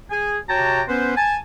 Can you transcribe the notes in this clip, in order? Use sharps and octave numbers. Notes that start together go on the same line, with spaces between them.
G#4 G#5
C3 F#4 C#5 G5 A5 A#5
B3 C#4 B4 C5
G#5 A5